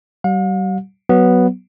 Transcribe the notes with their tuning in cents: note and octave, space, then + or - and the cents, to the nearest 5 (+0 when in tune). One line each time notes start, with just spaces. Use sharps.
G3 -40 F5 +45
F#3 +10 B3 +0